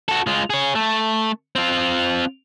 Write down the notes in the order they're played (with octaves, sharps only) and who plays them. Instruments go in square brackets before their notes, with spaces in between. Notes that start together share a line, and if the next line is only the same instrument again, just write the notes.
[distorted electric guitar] F#4 A4
G#3 F4
G#4 C#5
A3
C4 F4